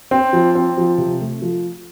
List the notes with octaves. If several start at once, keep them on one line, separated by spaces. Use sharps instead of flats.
C4
F3
C4
F3
C3
A3
F3